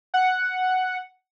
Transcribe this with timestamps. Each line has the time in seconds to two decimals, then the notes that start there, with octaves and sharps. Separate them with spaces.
0.14 F#5